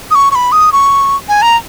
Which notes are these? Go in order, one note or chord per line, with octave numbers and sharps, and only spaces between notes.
D#6
C#6
C#6
B5
D#6
C#6
G#5
A#5